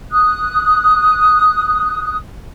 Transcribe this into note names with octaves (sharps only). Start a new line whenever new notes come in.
D#6 F#6